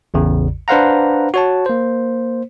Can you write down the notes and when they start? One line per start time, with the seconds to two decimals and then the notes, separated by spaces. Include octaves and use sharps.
0.14 A1 E2 C#3
0.68 D4 B4 C5 F5 F#5 A#5
1.34 F#4 C#5 A5
1.66 A#3 C5